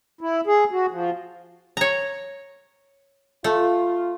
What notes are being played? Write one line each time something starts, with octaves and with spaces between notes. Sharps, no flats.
E4
G#4
F#4
F3
C#5 A#5
A3 F4